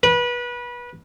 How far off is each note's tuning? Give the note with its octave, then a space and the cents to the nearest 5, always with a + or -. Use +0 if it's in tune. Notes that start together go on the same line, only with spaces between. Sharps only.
B4 -25